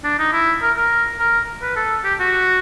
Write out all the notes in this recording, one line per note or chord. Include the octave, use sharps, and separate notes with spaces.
D4
D#4
E4
A#4
A#4
A#4
B4
A4
G4
F#4